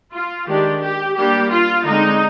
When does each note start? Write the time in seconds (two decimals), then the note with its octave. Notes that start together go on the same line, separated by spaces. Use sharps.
0.13 F4
0.48 D#3 G#3 D4 G4
0.82 G4
1.16 G3 A#3 D4 G4
1.51 F4
1.85 D3 G#3 C4 D#4